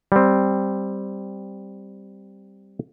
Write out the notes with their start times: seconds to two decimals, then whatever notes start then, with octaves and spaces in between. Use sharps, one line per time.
0.12 G3 C4